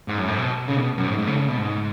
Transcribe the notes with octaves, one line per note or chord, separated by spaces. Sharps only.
G#2
F#2
G#2
B2
C#3
B2
F#2
G#2
G#2
C#3
C#3
B2
G#2